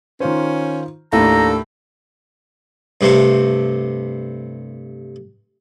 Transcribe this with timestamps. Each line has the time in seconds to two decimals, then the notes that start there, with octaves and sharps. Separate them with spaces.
0.20 D#3 C#4 F4 C5
1.13 D#2 A2 D4 A4 A#5
3.01 G2 C3 A3 C4